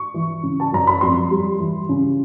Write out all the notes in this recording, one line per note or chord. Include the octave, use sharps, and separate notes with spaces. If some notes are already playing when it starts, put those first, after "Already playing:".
Already playing: C#6
E3
C#3
A5
F#2 A#5
B5
F2 C6
G3
E3
C#3